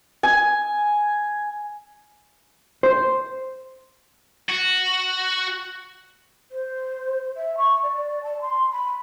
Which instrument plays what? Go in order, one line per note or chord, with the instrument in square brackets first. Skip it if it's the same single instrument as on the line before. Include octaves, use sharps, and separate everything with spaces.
[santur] G#5
[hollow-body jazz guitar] C5
[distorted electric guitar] F#4
[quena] C5
E5
C#6
D5
A5
C6
B5